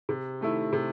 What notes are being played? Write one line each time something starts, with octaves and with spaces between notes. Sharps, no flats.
C3
D#3 A3 E4
C3